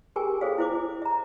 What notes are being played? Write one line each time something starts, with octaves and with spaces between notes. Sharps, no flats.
G4 G#4 A#4 G5 G#5
G#4 A4 C5 C#5 F5
E4 C5 D6
E5 A#5